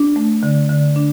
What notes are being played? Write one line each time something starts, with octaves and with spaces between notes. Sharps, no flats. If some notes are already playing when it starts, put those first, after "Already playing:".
Already playing: D4
A3
D3
D3
D4